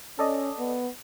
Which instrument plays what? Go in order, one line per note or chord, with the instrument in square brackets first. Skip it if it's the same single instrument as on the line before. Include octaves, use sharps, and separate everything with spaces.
[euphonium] C#4 [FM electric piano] A4 D5 D#5
[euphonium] B3